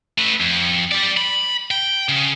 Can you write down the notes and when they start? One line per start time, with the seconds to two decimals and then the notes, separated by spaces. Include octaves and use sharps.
0.18 A3 B4
0.40 F2
0.92 G3 D5
1.17 B5
1.71 G5
2.09 C#3